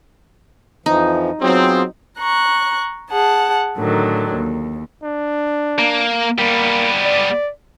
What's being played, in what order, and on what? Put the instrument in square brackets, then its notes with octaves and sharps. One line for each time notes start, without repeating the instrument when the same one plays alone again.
[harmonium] F2 E3 F3 [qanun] D#4
[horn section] F#3 C4 [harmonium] B3 F4 G#4
[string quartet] A#5 C#6 F#6
G#4 F#5 A5
A2 D3 D#3 F#3
D#2
[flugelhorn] D4
[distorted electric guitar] A#3
[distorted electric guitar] G3 B3 [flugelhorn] A#3
[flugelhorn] D5